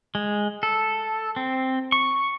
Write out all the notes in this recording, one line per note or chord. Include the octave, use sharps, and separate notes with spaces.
G#3
A4
C4
C#6